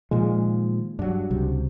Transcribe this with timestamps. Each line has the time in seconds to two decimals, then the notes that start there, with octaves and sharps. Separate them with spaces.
0.11 A#2 D#3 F3 G#3
0.99 G2 F#3 D4 F#4
1.30 C#2 C3 G3